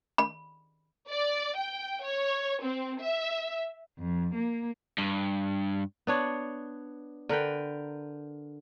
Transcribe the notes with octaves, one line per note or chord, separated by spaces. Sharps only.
B5
D5
G5
C#5
C4
E5
F2
A#3
G2
B3 D4 C#5
D3 A#4 B4 G5